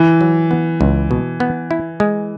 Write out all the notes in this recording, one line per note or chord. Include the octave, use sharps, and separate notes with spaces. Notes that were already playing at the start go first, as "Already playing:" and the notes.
Already playing: E3 E4
F#3
B3
C#2
B2
B3
E4
G#3